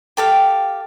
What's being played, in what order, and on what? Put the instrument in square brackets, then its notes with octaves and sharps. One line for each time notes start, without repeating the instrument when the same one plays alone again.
[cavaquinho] G4 A4 F5 G5